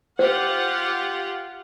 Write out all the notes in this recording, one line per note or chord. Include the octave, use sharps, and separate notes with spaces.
F4 G4 C5 F#5